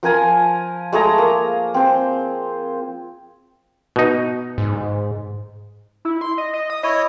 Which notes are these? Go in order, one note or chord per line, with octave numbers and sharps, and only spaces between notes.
F3 A#4 G#5 A#5
G#3 A3 G#4 A#5
A#3
C4 C5
B2 D#4
G#2
E4
C6
D#5
D#5
D#6
E4 C#5 D#5